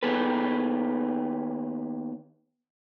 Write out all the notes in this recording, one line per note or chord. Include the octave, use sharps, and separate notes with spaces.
D#2 D#3 B3 G#4 A4 B4